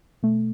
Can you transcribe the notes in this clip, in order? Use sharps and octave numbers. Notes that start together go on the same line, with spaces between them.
B2 A3